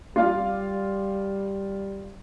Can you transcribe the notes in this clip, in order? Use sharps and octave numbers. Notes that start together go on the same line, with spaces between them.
G3 F4 D5 F5